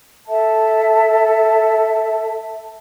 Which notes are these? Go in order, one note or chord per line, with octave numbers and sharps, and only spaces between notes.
A4 E5 A5